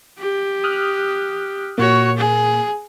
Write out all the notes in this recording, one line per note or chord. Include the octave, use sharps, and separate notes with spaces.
G4
D#6 F6 F#6
A#2 A#3 F#4 C#5
G#4